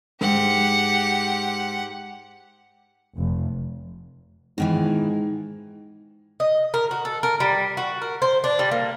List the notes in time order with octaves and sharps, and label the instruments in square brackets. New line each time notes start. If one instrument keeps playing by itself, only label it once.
[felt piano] G#2 [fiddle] G4 F#5
[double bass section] F1
[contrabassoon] G#2 [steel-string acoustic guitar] B2 D#3 E3
[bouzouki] D#5
A#4
F#4
A4
A#4
G3
F#4
A#4
C5
D4
G3
A#3